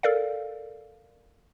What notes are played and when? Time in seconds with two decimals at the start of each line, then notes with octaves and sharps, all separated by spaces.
0.03 A4 A#4 D5 F5